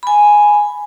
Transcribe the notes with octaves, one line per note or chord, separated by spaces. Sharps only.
G#5 B5